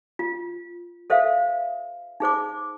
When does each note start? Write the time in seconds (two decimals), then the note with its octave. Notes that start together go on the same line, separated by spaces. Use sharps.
0.19 F4
1.10 A4 C5 E5 F5
2.20 D#4 G#4 C5 D6